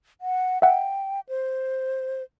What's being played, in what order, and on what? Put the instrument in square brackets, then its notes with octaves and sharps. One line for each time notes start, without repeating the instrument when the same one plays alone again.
[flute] F#5
[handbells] E5 F#5 [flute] G5
[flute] C5